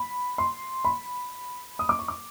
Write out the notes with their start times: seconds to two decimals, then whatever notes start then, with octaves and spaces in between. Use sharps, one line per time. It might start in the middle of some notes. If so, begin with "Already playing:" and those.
Already playing: B5
0.38 C6
0.85 B5
1.79 D#6
1.89 D6
1.99 C#6
2.08 D6